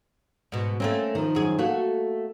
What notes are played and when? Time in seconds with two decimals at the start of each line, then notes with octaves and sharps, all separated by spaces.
0.52 G#2 B2
0.80 A3 A#3 C4 C#4
1.15 D#3 F3
1.35 F#2 G#4
1.59 A3 A#3 F#4